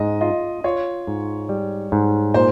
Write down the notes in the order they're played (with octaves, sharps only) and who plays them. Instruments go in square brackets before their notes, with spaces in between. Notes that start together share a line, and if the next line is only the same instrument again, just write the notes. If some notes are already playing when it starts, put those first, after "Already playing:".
Already playing: [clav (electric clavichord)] G#2 [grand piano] D#5
[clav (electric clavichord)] F4 [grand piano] D#5
[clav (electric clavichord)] F4 [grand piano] C#5
[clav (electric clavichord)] G#2
G3
G#2
[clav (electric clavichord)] A#2 [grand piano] C5